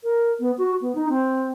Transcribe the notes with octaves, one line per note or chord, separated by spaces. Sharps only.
A#4
B3
F#4
B3
D#4
C4